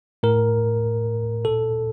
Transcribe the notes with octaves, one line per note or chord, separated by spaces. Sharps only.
A2 A#4
A#2 A4